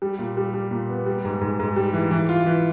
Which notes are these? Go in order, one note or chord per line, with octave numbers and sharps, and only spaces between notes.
G3
A#2
G3
G3
A#2
B3
G3
G#2
G#2
G#2
G3
E3
E3
F4
E3